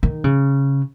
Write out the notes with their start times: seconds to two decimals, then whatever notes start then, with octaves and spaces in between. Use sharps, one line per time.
0.03 D#3
0.24 C#3